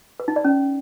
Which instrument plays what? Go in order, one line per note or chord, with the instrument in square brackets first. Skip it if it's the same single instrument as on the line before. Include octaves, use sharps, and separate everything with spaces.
[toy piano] B4
D#4
D5
C#4